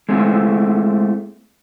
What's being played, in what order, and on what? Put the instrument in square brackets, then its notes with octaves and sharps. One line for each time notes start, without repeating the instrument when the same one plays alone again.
[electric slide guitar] G#3 A3 C4 E4